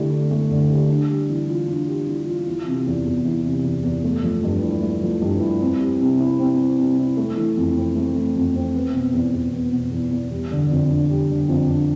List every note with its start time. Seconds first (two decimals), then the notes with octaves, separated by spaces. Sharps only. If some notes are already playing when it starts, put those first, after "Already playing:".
Already playing: D3 A3 E4 G4
0.11 E4
0.31 A3
0.51 D3
0.70 G4
0.89 D4
1.10 G3
1.29 E3
1.49 F4
1.68 D4
1.88 G3
2.07 E3
2.26 F4
2.47 E3
2.66 C3
2.86 E2
3.05 E2
3.25 E3
3.45 C3
3.64 E2
3.83 E2
4.04 A3
4.23 F3
4.43 G2
4.62 E4
4.82 A3
5.02 F3
5.22 G2
5.40 E4
5.61 C4
5.80 G3
6.00 C3
6.19 E4
6.39 C4
6.59 G3
6.78 C3
6.98 E4
7.17 A3
7.37 E3
7.57 F2
7.76 C4
7.95 A3
8.15 E3
8.36 F2
8.55 C4
8.75 B3
8.94 B2
9.14 E2
9.34 E2
9.53 B3
9.72 B2
9.91 E2
10.11 E2
10.31 G3
10.51 D3
10.71 F2
10.90 D4
11.10 G3
11.30 D3
11.48 F2
11.68 D4